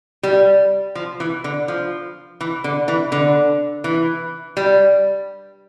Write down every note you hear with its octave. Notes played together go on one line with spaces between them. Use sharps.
G3
F3
E3
D3
F3
E3
D3
E3
D3
E3
G3